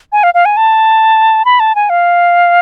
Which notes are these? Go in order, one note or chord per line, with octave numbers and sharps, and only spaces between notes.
G#5
F5
F5
G#5
A5
B5
A5
G#5
F5